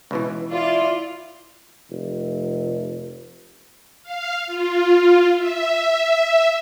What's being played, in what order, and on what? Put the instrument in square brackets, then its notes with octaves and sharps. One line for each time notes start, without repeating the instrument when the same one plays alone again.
[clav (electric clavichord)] C#2 B2 E3
[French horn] E4 [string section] F4 D5
[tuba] F1
[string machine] F5
F4
E5